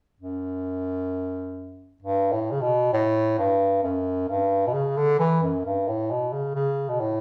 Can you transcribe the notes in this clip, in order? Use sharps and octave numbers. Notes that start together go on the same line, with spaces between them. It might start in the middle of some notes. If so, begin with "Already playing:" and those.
F#2
G2
A2
C#3
B2
A2
G2
F#2
G2
B2
C#3
D3
E3
F#2
G2
A2
B2
C#3
C#3
B2
A2